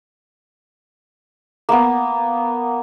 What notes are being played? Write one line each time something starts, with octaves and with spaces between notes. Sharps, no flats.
A#3 B3